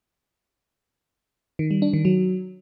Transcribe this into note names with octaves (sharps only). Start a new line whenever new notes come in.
D#3
G3
D4
D#3
F#3